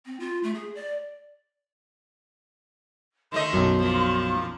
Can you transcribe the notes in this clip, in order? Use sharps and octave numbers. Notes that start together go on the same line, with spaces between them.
C4
F4
A3
G#4
D5
D#3 A3 D#5 C6
B1 F#2
A#2 F3